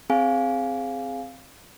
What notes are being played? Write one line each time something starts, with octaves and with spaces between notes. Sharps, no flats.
C4 G#4 F5 G#5